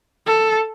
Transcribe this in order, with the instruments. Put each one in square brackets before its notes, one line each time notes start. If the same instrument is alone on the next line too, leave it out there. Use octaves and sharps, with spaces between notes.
[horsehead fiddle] A4